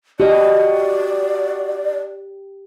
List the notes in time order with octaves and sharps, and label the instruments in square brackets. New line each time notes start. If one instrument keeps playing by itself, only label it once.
[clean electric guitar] F#4 D#5 [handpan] G4 [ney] D5